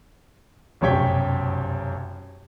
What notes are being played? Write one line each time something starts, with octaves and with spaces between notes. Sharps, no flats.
F1 B1 F#2 C#5 G5 B6